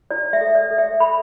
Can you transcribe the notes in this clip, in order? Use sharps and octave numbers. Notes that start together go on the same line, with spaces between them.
E4 D5
E5
A4
D5
A4
E5
A4 B5